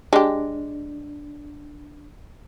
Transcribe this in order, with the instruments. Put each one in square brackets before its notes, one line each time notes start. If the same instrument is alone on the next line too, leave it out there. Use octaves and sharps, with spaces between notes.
[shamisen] G#3 G4 [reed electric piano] D4